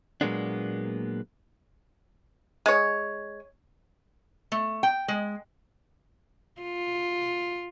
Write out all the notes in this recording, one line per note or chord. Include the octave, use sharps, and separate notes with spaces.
A#2 F#3 G#3 A#3 B3 D4
G#3 C#5
A3
G5
G#3
F4